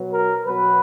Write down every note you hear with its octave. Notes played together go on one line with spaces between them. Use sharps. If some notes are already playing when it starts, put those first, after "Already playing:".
Already playing: B2 F#3
A#4
B2 F#3 B4